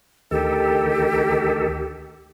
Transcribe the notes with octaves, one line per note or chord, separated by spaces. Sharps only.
D2 D#3 G4 A4